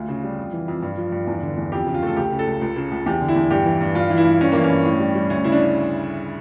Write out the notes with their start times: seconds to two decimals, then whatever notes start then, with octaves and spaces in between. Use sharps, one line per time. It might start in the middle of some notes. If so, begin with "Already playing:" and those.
Already playing: D2 F4
0.08 C#3
0.24 G3
0.38 F2
0.53 E3
0.68 F2
0.82 G2
0.97 F3
1.12 G2
1.27 E2
1.42 D3
1.57 E2
1.72 F2 G4
1.87 C#3
1.94 F4
2.02 A3 A4
2.16 C#2 G4
2.31 C#3
2.39 A4
2.47 C#2
2.61 C#2
2.76 C#3
2.91 C#2
3.06 E2 G4
3.21 D3
3.28 E4
3.36 E2
3.50 G2 G4
3.66 E3
3.81 G2
3.95 G2 F4
4.10 E3
4.17 E4
4.25 G2
4.41 G2 C#4
4.52 E3 A#3
4.64 C#4
4.70 G2
4.85 A2
5.00 G3
5.15 G3
5.30 D2 C#4
5.44 C#3 E4
5.52 D4